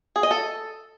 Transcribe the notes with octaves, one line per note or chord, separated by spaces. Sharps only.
G#4
D#5
A4